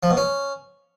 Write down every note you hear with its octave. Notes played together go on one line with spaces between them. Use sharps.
F3
B2
C#4